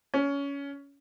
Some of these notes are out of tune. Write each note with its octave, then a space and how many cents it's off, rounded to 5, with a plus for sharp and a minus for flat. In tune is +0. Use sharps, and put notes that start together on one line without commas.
C#4 +20